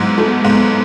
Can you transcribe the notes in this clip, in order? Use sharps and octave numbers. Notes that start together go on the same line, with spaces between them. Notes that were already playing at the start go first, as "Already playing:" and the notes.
Already playing: G#2 F#3 G#3 B3
A3
G#2 G#3 B3